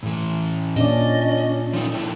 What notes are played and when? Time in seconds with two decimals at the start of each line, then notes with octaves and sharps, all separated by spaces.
0.03 A2 E3
0.76 A#2 C#4 D4 D5 D#5
1.73 F3 D#4
1.94 A#2 E4